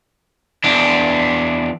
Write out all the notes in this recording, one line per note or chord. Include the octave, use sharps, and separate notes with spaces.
E2 D4